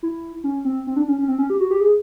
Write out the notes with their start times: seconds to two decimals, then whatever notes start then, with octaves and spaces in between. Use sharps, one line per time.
0.03 E4
0.44 C#4
0.65 C4
0.87 C4
0.96 D4
1.08 C#4
1.18 C#4
1.28 C4
1.38 C#4
1.50 G4
1.60 F#4
1.71 G4
1.81 G#4